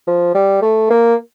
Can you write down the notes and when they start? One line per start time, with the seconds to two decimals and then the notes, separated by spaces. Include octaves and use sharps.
0.07 F3
0.35 G3
0.62 A3
0.90 A#3